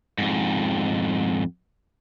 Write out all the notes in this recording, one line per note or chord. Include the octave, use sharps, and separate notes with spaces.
F2 G#2